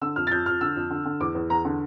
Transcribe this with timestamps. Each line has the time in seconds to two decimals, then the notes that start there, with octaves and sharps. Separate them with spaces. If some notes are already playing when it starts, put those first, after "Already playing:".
0.02 D3 E6
0.16 F2 F6
0.27 A6
0.31 F2 G6
0.46 F2 F6
0.61 D3 E6
0.76 F2
0.90 D3
1.05 D3
1.20 E2 D6
1.35 E2
1.50 E2 A#5
1.65 D3